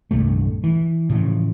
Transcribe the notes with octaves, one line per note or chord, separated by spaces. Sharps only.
D#1 C2 G2 A3
E3
A2 C#3 E3 F3